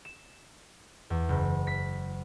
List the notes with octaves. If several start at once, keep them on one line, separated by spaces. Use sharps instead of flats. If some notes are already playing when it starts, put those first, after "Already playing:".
E7
E2
F#1
B6